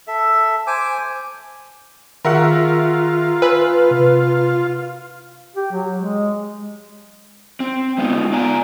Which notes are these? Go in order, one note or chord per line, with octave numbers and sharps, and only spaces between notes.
A4 E5
C5 G#5 D6
D#3 F4 G#4 A#4 E5 F#5 C#6
B4 G#5 E6
C3
G4
F#3
G#3
C4
G#3 B3 D#4
B3 D5 G#5 A#5